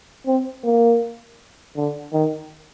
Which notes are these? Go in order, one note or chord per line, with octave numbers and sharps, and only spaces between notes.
C4
A#3
D3
D#3